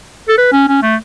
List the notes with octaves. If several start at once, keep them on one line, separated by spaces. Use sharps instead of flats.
A4
B4
C#4
C#4
A3